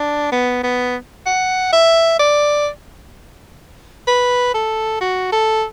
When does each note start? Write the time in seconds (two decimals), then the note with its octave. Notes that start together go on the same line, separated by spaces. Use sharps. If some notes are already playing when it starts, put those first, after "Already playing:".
Already playing: D4
0.32 B3
0.63 B3
1.26 F#5
1.72 E5
2.19 D5
4.08 B4
4.54 A4
5.01 F#4
5.32 A4